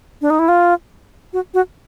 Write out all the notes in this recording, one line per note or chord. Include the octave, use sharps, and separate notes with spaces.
D4
D#4
E4
F4
F#4
F#4